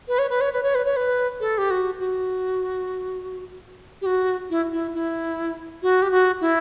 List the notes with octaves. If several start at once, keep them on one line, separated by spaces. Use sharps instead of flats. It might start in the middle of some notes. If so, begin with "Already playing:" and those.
B4
C#5
B4
C#5
B4
C#5
B4
C#5
B4
A4
G4
F#4
F#4
G4
F#4
E4
E4
E4
F#4
G4
F#4
E4